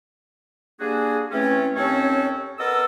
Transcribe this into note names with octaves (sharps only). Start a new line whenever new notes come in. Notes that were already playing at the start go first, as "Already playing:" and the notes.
G3 A#3 D4 F#4 G#4
E3 A3 C4 C#4
D#2 C4 C#4 A4 C#5
B3 A4 A#4 D#5 E6